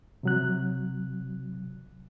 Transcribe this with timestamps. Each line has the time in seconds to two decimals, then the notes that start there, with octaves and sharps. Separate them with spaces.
0.23 C3 F#3 F#6